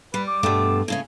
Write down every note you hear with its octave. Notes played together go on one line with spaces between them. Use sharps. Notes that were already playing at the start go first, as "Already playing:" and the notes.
G3 B4
D6
G2 B2 A3
A2 C#3 C#4